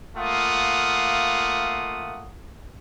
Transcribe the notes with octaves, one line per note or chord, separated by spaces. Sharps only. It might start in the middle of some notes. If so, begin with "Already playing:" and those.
A3 A#3 F4 F5 F#5 D#6